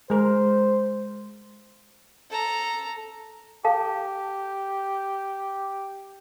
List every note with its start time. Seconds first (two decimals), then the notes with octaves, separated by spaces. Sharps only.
0.10 G#3 A#4 C5
2.30 A4 A#5
3.65 G4 A4 F5 A5